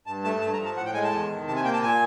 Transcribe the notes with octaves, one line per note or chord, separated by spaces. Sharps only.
G2 A5
A3 A5
G2 A5
A#5
F3
A5
A2 F#5
G5
G#3 G#5
A5
E2
D#3
C3 A5
G#5
A#3 G5
A5
A#2 G#5